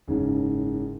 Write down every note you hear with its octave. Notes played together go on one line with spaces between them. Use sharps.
F#1 G#2 C#3